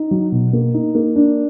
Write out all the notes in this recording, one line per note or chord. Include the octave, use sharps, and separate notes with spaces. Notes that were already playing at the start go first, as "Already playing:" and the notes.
Already playing: D#4
F#3
B2
A#3
D#4
A#3
D4